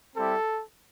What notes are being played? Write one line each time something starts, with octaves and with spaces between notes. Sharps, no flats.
G3 C4 E4 G4 A4